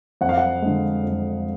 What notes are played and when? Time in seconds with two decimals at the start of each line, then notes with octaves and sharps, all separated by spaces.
0.21 F2 F#5
0.29 F5
0.38 F#5
0.62 D3 G#3
1.03 F2